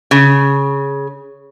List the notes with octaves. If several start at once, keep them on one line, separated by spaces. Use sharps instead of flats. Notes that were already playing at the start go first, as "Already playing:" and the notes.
C#3